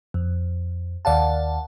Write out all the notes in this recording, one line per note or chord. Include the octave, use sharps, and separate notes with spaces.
F2
D#2 D5 F5 F#5 A5